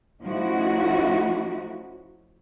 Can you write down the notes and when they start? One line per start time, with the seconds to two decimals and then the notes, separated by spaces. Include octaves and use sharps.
0.22 F3 A3 C#4 D#4 E4 F#4